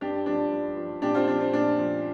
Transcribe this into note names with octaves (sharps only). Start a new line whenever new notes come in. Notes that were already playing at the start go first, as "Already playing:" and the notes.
G2 D4 G4
F3 D4
G2
F3
A#2 D4 G4
C4 F4
F3 D4
C4
A#2 D4
F3